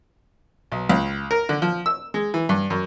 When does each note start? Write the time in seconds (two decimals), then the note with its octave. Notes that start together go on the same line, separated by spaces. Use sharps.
0.72 B1
0.89 C#2
1.31 A#4
1.49 D3
1.62 F3
1.86 E6
2.14 G#3
2.34 E3
2.49 G2
2.70 F#2